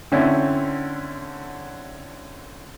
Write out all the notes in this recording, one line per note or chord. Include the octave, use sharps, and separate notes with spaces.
D3 C4 C#4 E4